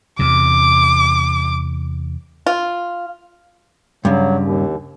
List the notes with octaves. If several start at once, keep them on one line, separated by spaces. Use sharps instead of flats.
E2 C3 D6
F4
G2 C#3 F#3
D#2